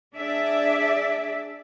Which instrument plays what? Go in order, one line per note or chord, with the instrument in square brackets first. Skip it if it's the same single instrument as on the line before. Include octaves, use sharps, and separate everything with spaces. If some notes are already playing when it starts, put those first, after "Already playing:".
[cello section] D4 G#4 D5 E5